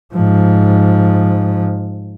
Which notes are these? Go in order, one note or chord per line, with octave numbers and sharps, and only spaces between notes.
G#2 F3